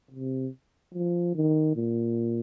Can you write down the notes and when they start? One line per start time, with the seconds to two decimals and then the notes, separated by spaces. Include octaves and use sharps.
0.11 C3
0.95 F3
1.35 D#3
1.76 A#2